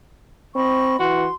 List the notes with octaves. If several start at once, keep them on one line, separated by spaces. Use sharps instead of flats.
C4 D#5 B5 C#6
E3 F#4 C6